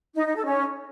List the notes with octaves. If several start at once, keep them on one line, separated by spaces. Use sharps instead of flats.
D#4
D#4
A4
C#4